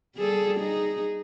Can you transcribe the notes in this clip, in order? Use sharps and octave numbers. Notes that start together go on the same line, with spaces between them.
G3 G#4 A4
D#4 G#4